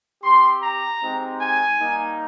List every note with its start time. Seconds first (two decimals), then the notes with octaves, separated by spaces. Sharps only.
0.23 C4 G4 C6
0.61 A#5
1.01 G#3 C4 D#4 G4
1.40 G#5
1.80 G3 A#3 D#4